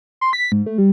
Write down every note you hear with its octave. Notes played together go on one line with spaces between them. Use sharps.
C6
B6
G#2
A3
G3